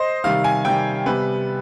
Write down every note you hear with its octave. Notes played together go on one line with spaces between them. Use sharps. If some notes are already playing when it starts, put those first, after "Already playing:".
Already playing: C5 D#5
C3 D#3 G3 F5
G#5
C3 D#3 G3 G5
C3 G3 B3 B4